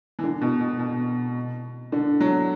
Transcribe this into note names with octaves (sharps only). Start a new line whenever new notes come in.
E3
D3
B2
B2
B2
D3
F#3